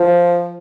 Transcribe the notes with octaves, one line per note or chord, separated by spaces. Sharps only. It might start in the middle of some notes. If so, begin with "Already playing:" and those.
Already playing: F3